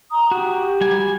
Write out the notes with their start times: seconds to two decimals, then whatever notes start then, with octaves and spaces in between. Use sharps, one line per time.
0.11 A#5 D#6
0.31 F#4 G4
0.81 G3 G#5